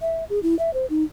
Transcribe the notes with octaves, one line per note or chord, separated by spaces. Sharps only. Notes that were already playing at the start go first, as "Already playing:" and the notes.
E5
G#4
E4
E5
C5
D#4